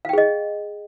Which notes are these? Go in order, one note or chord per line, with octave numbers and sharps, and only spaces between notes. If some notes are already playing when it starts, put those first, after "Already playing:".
G#4 D#5 F5 G5